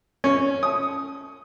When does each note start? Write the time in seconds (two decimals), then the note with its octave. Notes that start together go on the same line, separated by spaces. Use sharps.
0.24 C#4
0.63 D#6